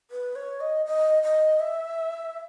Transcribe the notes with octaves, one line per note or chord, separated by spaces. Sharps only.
B4
C#5
D#5
D#5
D#5
E5